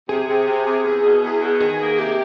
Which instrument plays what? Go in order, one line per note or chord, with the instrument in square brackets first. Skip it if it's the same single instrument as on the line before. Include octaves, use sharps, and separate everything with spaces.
[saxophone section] C3 [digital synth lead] G#4
[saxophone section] C3
C3
C3
E2
B2
E2
B2
[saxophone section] D#3 [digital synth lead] G#4
[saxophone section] A#3
[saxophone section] C3 [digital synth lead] G4